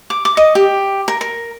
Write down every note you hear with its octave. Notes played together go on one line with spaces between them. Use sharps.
D6
D6
D#5
G4
A#4
A#4